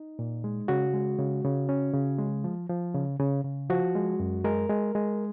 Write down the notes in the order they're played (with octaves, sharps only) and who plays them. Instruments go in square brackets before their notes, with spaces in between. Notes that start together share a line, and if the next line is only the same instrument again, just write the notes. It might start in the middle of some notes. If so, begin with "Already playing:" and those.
Already playing: [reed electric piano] D#4
A#2
G#3
C#3 F#4
G#3
C#3
C#3
C#4
C#3
G#3
F3
F3
C#3
C#3
C#3
F3 F#4
G#3
F#2
G#3 A#4
G#3
G#3